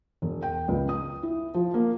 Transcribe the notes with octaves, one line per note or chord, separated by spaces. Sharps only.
E1
G5
C#2
D#6
E4
F3
A#3